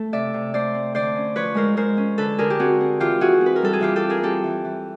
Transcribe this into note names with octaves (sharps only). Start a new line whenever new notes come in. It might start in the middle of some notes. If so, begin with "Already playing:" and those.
Already playing: A3 A4
C3 D5 E5
C3
A3 C5 D5
C4
D3 C5 D5
C#4
F3 B4 C#5
G#3 A#4 C5
G#3 A#4 C5
C#4
D3 A4 B4
D3 G#4 A#4
G4
C4 F#4 G#4
C4
E3 F4 G4
E3 F#4 G#4
C4
B4
A#4
G3 A4
G#4
E3 F4 G4
G4 A4
C4
G#4 A#4
C4 G4 A4
E3
E3